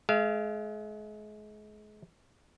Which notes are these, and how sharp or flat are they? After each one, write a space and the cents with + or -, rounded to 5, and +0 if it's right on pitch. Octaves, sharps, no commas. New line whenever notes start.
G#3 +35 F5 -30